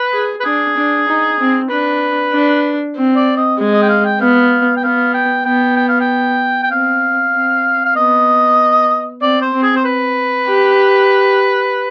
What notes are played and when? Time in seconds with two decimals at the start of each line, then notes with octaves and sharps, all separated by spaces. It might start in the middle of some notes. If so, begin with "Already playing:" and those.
Already playing: B4
0.13 G#4
0.40 B4
0.45 D4 G#4
0.77 D4
1.08 D#4
1.39 C4
1.70 D4 B4
2.32 D4
2.96 C4
3.16 D5
3.37 D#5
3.58 G#3
3.73 D#5
3.82 G5
3.89 F5
4.05 G5
4.20 B3 F5
4.77 G5
4.84 B3 F5
5.14 G5
5.45 B3 G5
5.77 G5
5.89 F5
6.01 G5
6.63 G5
6.71 C4 F5
7.34 C4
7.85 F5
7.96 B3 D#5
9.22 C4 D5
9.42 C5
9.53 C4
9.63 G#4
9.76 C5
9.85 B4
10.47 G4